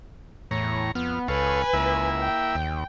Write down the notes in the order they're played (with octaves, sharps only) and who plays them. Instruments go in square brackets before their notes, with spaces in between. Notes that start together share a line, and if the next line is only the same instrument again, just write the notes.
[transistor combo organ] E2 C#5 A#5 [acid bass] A2
[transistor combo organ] F2 F6 [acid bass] B3
[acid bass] C#2 [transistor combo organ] A4 C#5 F5 [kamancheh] B4 G#5
[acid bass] C#2 [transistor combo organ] A#3 E4 E5
[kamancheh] G5
[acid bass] D#2